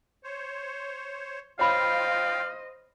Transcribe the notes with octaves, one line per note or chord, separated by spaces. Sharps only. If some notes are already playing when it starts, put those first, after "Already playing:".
C5 C#5
F4 C5 C#5 D#5 F5 G5 B5